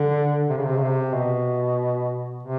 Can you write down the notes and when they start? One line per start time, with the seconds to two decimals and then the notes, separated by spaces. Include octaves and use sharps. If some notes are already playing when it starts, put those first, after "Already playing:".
Already playing: D3
0.49 C3
0.57 C#3
0.65 C3
0.77 C#3
0.82 C3
1.14 B2
2.43 C3